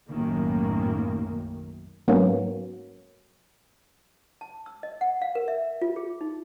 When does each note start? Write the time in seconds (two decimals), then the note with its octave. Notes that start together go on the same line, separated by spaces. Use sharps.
0.10 B1 F#2 A2 D#3 A#3
2.08 G#2 F#3 A#3 B3 C#4
4.41 A5
4.66 E6
4.83 D#5
5.01 F#5
5.22 F5
5.35 A#4
5.48 E5
5.82 F4
5.96 G#4
6.21 D#4